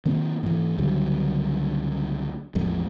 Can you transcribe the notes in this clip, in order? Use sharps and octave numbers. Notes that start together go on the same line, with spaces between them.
D#3 A#3 C4
G#2 E3
C#2 D3 F#3 G3
A1 E2 F3 G#3